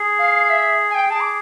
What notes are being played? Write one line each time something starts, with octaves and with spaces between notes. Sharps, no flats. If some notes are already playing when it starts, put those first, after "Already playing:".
Already playing: G#4
F5
E5
G#5
G5
G#4 A5
D6